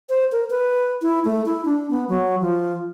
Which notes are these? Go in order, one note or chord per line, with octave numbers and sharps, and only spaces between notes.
C5
A#4
B4
E4
A3
E4
D4
B3
F#3
F3